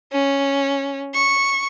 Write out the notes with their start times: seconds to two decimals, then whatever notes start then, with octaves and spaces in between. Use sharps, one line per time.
0.12 C#4
1.15 C#6